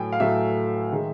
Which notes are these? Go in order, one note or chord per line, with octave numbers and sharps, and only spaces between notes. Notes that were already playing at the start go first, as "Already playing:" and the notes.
Already playing: A2 F#3 A3 G5 G#5
F5
A2 F#3 A3 E5
D#3 G#3